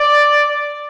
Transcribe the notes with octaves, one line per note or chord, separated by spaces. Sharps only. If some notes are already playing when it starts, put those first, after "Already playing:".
Already playing: D5